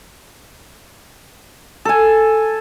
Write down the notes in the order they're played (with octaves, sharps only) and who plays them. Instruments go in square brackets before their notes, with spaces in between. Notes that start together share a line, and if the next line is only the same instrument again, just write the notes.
[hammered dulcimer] A4 G#5